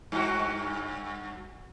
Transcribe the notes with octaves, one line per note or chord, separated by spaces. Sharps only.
G2 F#4